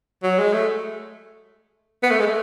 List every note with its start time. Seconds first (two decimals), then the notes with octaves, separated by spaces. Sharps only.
0.23 F#3
0.38 G#3
0.53 A3
2.03 B3
2.11 A3
2.19 G#3
2.27 A3